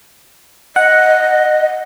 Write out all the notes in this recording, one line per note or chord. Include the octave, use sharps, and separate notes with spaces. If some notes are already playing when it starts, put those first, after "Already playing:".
D#5 F#5